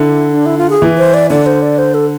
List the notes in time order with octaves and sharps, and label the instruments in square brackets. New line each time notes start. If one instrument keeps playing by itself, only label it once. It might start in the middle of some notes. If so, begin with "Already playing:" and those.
Already playing: [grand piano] D3 [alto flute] E4
[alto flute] D4
E4
F4
G#4
[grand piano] E3
[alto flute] C5
D5
[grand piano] D3 [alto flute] D5
[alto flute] C5
D5
C5
A4